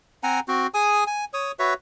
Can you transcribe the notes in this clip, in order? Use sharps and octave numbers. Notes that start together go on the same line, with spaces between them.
C4 F#5 G#5 A#5
C4 F#4
G#4 G#5 D#6
G#5
C#5 D#6
F#4 B4 C#5 E5